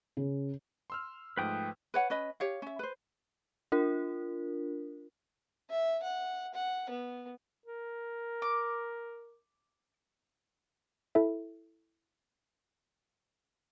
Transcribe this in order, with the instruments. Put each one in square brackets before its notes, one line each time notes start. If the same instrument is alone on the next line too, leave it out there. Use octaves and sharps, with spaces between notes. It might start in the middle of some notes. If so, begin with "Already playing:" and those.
[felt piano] C#3
[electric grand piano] C6 E6 F6
[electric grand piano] G#2 F3 A3 [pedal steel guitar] B4 G5 D#6
[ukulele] B4 C#5 F#5
C#4 B4 D#5
G4 C#5 F5
C#4 E5
B4 C5
[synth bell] D4 F4 A#4
[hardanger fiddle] E5
F#5
F#5
B3
[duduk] A#4
[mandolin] D6
[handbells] E4 A4 E5